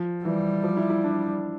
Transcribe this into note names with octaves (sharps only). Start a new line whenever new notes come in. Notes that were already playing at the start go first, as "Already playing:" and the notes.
Already playing: F3
E3 G3
F3
E4
E4
D4